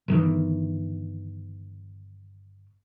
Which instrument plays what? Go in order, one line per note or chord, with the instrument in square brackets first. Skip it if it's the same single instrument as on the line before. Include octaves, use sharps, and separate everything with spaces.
[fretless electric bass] G1 D#3 E3